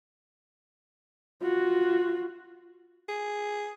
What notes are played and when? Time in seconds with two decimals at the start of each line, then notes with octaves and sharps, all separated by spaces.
1.42 F4 F#4
3.09 G#4